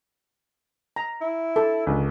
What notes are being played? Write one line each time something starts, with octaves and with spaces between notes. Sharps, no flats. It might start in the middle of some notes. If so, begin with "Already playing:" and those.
A#5
E4
A4
C#2 D3